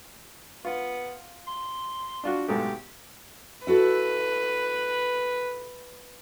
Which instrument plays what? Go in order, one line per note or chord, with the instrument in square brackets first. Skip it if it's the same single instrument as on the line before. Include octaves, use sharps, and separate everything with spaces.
[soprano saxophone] B3 [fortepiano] F4
[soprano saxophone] C6
[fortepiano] D4 F4 F#4
[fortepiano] B1 G#2 A3 [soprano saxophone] G4
[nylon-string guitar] E4 F#4 A4 [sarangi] B4